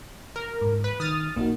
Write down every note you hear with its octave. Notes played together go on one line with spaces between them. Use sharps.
A#4
G#2
B4
D#3 D#6 F6 A6
A#1 A#3 D#4 F#4